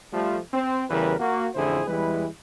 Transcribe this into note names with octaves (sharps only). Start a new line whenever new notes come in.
F3 G3 A3
C4
E2 C#3 E3 G3 A#4 B4
A#3 F#4
A1 F2 D3 E4 G#4 C5
E2 E3 G3 G#3 E4 B4